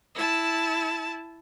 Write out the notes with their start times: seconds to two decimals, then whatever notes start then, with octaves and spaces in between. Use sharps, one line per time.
0.15 E4 A5